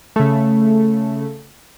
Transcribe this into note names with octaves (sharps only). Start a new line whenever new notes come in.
C#3 A3